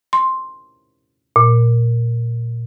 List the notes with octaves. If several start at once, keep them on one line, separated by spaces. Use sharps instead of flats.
C6
A#2